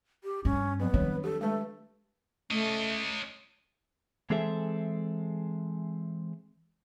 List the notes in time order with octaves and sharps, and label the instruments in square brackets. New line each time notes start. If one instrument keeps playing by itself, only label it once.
[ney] G4
[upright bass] G2 [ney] C#4
[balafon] F3 F#3 C4 [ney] B3
[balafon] D#3 G3 C#5 [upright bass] D4
[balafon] G4 [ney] A4
[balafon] G#3 B4 [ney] A3
[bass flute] A3 [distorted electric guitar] C#4 D#5
[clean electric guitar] E3 G#3 C4 G#4 A4 E5